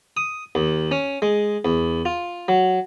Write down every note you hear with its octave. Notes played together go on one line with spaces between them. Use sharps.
D#6
D#2
C#4
G#3
E2
F4
F#3